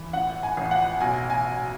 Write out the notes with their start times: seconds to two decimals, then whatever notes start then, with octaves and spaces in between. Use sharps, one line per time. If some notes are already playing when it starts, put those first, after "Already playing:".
Already playing: E3
0.13 A1 F#5
0.43 G#5
0.57 A1
0.71 F#5
1.01 B1 G#5
1.30 G#5